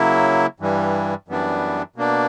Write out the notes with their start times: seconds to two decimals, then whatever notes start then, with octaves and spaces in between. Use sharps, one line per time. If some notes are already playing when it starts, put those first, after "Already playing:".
Already playing: C#3 F#3 A#3 E4
0.60 G2 E3 G3
1.28 F#2 E3 G3 B3 D4
1.96 B2 A#3 D4